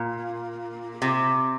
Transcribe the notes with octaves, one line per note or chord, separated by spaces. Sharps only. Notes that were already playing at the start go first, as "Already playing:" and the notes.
Already playing: A#2
C3